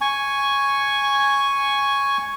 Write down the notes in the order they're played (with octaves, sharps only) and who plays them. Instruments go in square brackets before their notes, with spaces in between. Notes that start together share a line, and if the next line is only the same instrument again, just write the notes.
[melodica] G#5 C#6